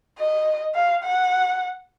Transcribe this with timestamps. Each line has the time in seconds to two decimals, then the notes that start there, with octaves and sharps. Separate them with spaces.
0.19 D#5
0.75 F5
1.04 F#5